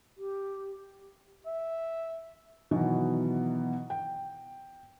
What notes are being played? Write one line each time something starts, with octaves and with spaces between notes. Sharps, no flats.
G4
E5
B2 D#3 E3 F#3 B3
G5